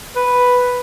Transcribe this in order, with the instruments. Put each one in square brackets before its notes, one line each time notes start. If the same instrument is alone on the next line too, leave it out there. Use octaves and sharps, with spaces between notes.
[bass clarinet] B4